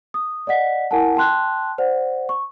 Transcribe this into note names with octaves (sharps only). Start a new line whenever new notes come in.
D#6
D5 D#5 F#5 B6
E4 A#4 F#5 G#5 A5
G5 A5 C6 F#6
C5 D5 F#5
C#6